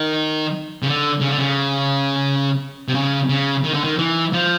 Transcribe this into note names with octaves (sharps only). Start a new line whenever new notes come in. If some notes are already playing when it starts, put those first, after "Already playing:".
Already playing: D#3
C#3
D3
C#3
D3
C#3
C3
C#3
C#3
D#3
D3
D#3
E3
F3